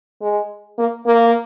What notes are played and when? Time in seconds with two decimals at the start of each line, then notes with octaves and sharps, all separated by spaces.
0.22 G#3
0.78 A#3
1.06 A#3